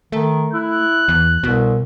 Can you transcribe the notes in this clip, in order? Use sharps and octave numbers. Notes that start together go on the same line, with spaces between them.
D#3 A3
E4 F#6
E2
C2 B2